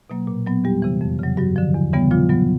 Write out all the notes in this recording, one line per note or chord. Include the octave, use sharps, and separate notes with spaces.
B2 F#3 A#3
A#2
F#3 B3
E2 G3 G4
C3 E3
F2
C#3 F#3
G2 F#3 F#4
D3 F3
E2
C#3 E3 G3 B3
A#2 F3 F4
F#3 B3